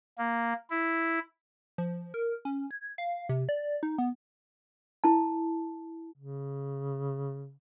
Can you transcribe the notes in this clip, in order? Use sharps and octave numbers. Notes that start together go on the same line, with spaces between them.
A#3
E4
F3
A#4
C#4
G#6
F5
C3
D5
D#4
B3
E4 A5
C#3